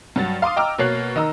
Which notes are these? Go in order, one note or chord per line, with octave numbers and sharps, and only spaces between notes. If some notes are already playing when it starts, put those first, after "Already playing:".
G2 F#3 A6
F5 C6 D6 D#6
D#5 G5 A#5 D6 E6 F6
B2 A#3 C#5 F#6 C7
D#3 D#5 A#5 E6